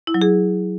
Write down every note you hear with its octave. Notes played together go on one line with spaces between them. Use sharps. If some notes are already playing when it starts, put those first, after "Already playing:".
E4
F#3
G#4